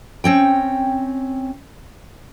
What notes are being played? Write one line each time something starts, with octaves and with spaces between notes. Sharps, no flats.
C4 C#4 G5